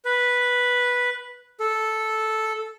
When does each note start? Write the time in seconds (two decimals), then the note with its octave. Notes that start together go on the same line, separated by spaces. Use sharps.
0.05 B4
1.60 A4